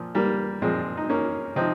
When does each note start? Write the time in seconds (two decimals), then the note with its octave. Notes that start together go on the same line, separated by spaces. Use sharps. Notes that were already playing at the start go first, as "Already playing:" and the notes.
Already playing: A#2 F3
0.15 G3 A#3
0.62 A#2 F3 G#3 C4
0.97 D#4
1.09 A#3 C#4
1.56 C3 F3 C4 D#4